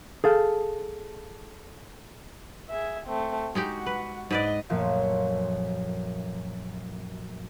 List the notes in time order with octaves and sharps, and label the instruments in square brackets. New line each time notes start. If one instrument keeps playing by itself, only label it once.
[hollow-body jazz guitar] G#4 A4 F5
[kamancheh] G#4 E5
A3 C4
[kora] G#3 D#4 G4 [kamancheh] F#4 F#5
[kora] B4
[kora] G#2 B4 D5 [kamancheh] D#5
[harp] A#1 F#2 A#2 F3 A3